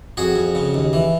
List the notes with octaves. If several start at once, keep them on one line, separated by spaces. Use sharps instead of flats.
F2 F#4 G#4
F2
C#3
D#2
E3